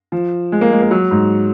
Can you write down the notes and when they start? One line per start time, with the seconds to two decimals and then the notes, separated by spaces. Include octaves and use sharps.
0.12 F3
0.52 G#3
0.61 A#3
0.72 G#3
0.82 A#3
0.91 F#3
1.11 G#2